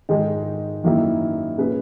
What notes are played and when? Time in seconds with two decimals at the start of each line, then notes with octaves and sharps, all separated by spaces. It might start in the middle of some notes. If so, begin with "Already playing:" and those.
0.09 G#2 D#3 G#3 D#4 G#4
0.84 F#2 D#3 A#3 E4
1.58 A#2 A#3 C#4 G#4 B4